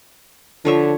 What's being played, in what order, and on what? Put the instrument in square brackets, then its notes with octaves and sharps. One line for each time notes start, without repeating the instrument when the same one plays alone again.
[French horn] D3 [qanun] F3 C#5 E5